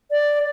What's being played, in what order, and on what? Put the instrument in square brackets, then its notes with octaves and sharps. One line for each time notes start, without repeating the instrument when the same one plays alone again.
[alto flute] D5